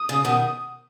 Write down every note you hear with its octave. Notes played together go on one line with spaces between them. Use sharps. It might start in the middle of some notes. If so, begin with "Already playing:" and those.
Already playing: D#6
C#3
B2 D#3